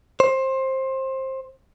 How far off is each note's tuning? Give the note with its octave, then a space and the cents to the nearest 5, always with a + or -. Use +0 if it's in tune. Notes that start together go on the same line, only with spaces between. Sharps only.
C5 +20